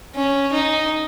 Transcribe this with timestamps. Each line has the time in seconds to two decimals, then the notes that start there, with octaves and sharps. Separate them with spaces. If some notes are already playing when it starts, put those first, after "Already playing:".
0.15 C#4
0.54 D#4